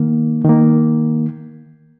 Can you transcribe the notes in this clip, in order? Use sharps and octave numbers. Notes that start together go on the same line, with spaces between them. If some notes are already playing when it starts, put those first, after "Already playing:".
Already playing: D#3 A#3
D#3 A#3